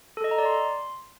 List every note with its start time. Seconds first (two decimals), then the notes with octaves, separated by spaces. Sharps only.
0.17 A4
0.24 D#5
0.31 A#5
0.38 D5
0.46 C6